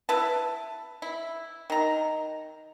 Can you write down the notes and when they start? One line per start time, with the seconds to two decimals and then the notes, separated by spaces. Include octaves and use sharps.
0.09 E4 B4 A5
1.02 E4
1.70 D#3 A#5